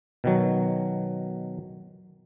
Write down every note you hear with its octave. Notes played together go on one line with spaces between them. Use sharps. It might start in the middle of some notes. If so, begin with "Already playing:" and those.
B2 D#3 F#3